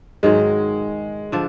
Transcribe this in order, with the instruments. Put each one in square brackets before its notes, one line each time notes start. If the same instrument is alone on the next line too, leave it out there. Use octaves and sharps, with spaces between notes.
[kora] G#2 D#3 F#3 [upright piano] G#3
[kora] D3 F3 D4